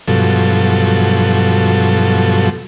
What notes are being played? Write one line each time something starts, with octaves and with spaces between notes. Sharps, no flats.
G2 B2 F3 F#3 A4